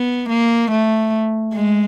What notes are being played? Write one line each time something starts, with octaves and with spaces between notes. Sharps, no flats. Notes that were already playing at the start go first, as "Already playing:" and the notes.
Already playing: B3
A#3
A3
G#3